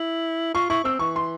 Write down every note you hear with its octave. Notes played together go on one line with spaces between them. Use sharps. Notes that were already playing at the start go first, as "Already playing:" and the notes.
Already playing: E4
F4 C#6
E4 C#6
C4 E6
E3 C#6
C6